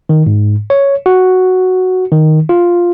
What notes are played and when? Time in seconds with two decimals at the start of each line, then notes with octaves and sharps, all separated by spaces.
0.09 D#3
0.26 G#2
0.70 C#5
1.06 F#4
2.12 D#3
2.49 F4